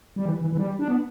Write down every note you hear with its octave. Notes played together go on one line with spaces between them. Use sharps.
G3
E3
E3
E3
G3
D4
B3